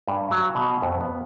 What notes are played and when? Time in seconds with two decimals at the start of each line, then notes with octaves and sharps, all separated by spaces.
0.08 G2
0.31 F#3
0.55 B2
0.82 F2
1.01 B3